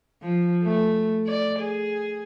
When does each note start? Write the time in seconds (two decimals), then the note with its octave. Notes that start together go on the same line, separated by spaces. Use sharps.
0.22 F3
0.63 A3
1.26 D5
1.59 G#4